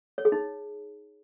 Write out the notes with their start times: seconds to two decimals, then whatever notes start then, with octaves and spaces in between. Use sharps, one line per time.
0.18 C#5
0.25 G#4
0.32 D#4